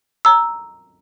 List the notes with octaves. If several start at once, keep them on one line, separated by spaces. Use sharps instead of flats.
A#5 E6